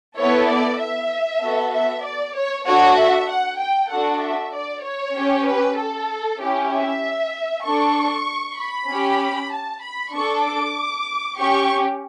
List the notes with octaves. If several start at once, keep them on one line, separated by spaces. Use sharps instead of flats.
B3 E4 A4 C#5
D5
E5
B3 F#4 A4
E5
D5
C#5
D4 F#4 A4 C#5
E5
F#5
G5
D4 F#4 A4 F#5
E5
D5
C#5
C#4 G4
B4
A4
C#4 E4 G4
E5
D4 A4 C#6
B5
C#4 G4
A5
B5
D4 A4 C#6
D6
C#4 G4 C#6